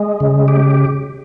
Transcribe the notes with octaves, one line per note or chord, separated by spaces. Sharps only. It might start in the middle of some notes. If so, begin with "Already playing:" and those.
Already playing: G#3
C#3
G4